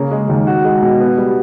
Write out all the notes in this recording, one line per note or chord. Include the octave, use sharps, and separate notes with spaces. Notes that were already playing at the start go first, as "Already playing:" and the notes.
Already playing: C#3 A#3
G#3
D#2
F#4
G#3
B2
B3
G3